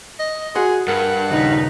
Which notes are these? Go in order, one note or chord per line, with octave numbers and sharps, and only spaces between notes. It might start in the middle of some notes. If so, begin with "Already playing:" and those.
D#5
F#4 G#4 F#5 C6
G2 A#4 F#5
D#2 A#2 C#3 D#4 B4